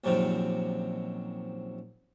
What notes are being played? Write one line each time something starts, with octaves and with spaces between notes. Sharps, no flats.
A#1 F#2 C3 D#3 F3